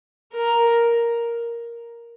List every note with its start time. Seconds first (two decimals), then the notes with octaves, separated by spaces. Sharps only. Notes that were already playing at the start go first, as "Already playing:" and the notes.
0.33 A#4